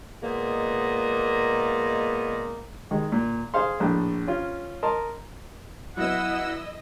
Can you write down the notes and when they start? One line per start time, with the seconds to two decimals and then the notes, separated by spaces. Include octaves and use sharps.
0.23 A#2 G#3 A#3 B3 D#4
2.91 D#3 G#3
3.12 A#2
3.54 G#4 C5 F5 C6
3.80 A#1 A2
4.27 C#4 F4
4.83 A#4 D#5 A5 C6
5.97 F#3 B3 E4 D#5 F#5 E6